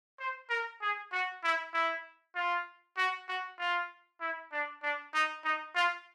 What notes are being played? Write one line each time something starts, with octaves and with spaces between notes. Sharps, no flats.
C5
A#4
G#4
F#4
E4
E4
F4
F#4
F#4
F4
E4
D4
D4
D#4
D#4
F4